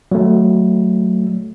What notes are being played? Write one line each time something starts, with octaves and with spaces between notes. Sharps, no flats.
F#3 A3